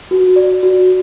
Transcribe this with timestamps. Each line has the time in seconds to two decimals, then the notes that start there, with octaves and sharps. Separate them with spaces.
0.11 F#4
0.36 D5
0.63 F#4